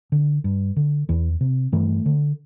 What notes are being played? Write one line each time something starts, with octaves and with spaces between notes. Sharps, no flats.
D3
G2
D3
E2 E3
C3
G2 E3 A3
D3